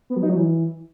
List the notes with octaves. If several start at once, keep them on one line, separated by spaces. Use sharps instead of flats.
B3
F#3
D#4
F#3
E3